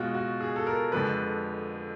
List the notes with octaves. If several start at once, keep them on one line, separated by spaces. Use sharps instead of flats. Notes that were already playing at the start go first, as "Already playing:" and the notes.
Already playing: B2 G#3 F4 F#4
F#4
G#4
A4
A#4
F2 D3 F3 G#3 B4